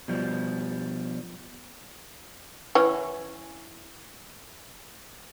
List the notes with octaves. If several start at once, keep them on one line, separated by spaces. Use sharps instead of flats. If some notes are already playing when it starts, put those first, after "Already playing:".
B2 F3 G3
E3 C#4